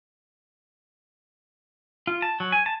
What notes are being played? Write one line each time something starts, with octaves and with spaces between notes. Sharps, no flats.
F4
A5
F#3
G#5
A5